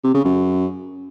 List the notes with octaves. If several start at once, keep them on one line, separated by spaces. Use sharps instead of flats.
C3
C#3
F#2